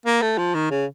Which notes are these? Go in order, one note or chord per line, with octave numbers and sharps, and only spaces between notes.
A#3
A3
F3
D#3
C#3